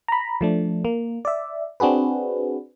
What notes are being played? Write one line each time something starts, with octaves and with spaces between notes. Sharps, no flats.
A#5 B5
F3 A3 D4
A#3
D5 E5
C4 D4 F#4 G#4 B4